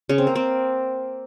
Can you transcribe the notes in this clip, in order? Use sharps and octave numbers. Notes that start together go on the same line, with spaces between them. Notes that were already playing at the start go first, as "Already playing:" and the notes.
C#3
C4
A#3
C4